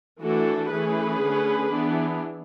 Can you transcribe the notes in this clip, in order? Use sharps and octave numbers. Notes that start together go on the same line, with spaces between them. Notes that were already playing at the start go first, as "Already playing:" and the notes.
E3 A3 D4 F#4 A4
E3 A3 C#4 G#4 B4
D3 A3 C#4
E3 B3 D4